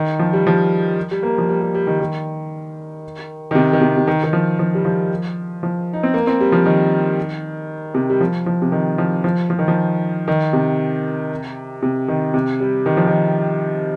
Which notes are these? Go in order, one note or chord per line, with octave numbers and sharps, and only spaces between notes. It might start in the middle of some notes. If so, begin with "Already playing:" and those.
Already playing: D#3
F3
G3
F3
G3
A#3
F3
G3
G3
G3
D#3
D#3
D#3
C3
D#3
C3
C3
D#3
D#3
F3
F3
G3
F3
F3
D#4
C4
A#3
C4
G3
F3
D#3
C3
G3
F3
F3
C3
D#3
F3
F3
F3
D#3
F3
D#3
C3
C3
D#3
C3
G3
D#3
F3
D#3